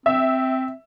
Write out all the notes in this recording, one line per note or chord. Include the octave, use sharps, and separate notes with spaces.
C4 E5